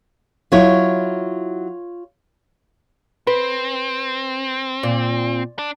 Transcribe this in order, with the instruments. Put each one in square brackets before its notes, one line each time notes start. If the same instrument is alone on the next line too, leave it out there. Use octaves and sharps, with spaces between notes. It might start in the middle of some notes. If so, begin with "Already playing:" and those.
[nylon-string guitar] F#3 E4 [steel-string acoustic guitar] F4 C#5
[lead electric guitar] C4 [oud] B4
[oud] A#2
[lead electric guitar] D4